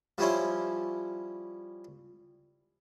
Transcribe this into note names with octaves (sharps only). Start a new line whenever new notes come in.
F3 G3 C#4 E4 F4